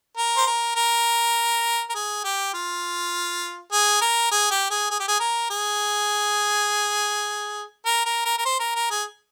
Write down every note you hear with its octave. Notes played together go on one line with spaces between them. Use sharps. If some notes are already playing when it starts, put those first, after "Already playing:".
A#4
C5
A#4
A#4
A#4
G#4
G4
F4
G#4
A#4
G#4
G4
G#4
G#4
G4
G#4
A#4
G#4
A#4
A#4
A#4
A#4
C5
A#4
A#4
G#4